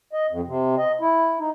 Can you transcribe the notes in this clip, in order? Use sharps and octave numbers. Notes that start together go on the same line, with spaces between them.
D#5
F2
C3
D#5
E4
D#4